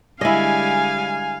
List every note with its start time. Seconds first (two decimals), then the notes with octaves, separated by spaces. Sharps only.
0.21 D3 G3 G#3 E4 D#5 F5 G#5